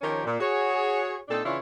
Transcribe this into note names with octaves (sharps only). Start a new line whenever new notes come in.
D#3 F3 C#4 G4 A#4 C#5
A#2
F#4 G#4 C#5
A#2 C4 D4 D#4 A4
C#3 E3 D4 E4 F4 C#5